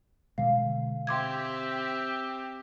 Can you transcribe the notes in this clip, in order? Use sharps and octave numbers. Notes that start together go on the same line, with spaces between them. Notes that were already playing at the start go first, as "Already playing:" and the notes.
B2 D3 G#3 F5
C4 G4 E5 C6 D6 G#6